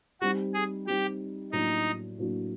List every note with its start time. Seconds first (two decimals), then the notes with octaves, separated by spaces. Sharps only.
0.21 G3 C4 D#4 F#4
0.54 G#4
0.87 G3 C4 D#4 G4
1.52 A2 F#3 A#3 D4 D#4 F#4
2.18 A2 F#3 A#3 D4 F#4